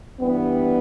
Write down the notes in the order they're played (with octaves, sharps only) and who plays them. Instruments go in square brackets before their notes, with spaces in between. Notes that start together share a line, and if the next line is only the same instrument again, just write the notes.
[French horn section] G2 E3 G3 B3